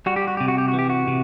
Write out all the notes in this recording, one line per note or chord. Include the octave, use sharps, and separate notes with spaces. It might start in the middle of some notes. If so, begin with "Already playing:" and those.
G3 F#4
G4
F#4
C3 G4
F#4
G4
F#4
E3
G4
F#4
C3